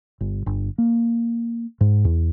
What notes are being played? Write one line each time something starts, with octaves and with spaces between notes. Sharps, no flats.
G1
G1
A#3
G#2
E2